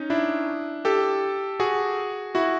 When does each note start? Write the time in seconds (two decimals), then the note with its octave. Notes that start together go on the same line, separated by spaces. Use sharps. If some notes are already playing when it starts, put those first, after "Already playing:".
Already playing: C#4 D#4
0.10 D4 E4
0.85 G4 A4
1.60 F#4 G#4
2.35 E4 F#4